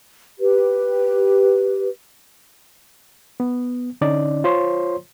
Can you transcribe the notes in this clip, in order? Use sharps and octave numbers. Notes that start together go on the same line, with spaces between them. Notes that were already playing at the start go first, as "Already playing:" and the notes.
G4 B4
B3
D3 C#4 D#4 D5
F4 C5 C#5 C6